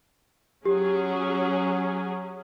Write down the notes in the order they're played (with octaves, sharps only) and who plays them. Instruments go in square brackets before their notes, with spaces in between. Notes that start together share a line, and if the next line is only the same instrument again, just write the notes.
[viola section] F#3 C#4 G#4 [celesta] G4